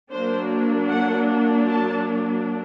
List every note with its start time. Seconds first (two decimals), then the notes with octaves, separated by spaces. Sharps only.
0.11 F#3 A#3 D4 C5
0.89 F#5
1.67 A5